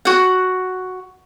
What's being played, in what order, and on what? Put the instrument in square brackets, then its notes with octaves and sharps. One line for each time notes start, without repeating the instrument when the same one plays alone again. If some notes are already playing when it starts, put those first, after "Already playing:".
[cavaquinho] F#4 F#5